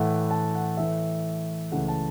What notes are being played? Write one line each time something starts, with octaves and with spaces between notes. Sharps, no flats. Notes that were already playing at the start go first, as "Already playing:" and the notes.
Already playing: A2 E3 A3 F#5
A5
F#5
A2 E3 A3 E5
C#2 C#3 E3 A3 F#5
A5